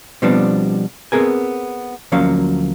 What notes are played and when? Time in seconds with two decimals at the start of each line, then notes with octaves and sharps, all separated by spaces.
0.22 B2 F3 G3 B3 C4 D4
1.12 B3 C4 G#4 A#4 G#5
2.12 D2 F3 F#3 A#3 C#4 F5